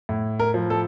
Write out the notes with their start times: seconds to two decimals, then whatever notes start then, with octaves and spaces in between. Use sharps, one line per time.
0.09 A2
0.40 A#4
0.54 F3
0.70 A4